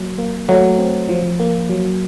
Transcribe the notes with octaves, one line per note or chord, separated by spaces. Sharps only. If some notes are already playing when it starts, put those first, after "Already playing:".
Already playing: F#3 A#3
A#3
F#3 A3
C4
F3
A#3
F#3